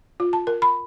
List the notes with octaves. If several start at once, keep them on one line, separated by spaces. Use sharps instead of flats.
F4
A5
A#4
B5